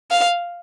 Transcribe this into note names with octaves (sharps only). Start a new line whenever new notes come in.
F5